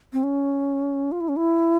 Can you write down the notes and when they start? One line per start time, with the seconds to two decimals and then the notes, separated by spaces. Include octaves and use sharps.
0.13 C4
0.23 C#4
1.12 F4
1.21 E4
1.29 C#4
1.37 E4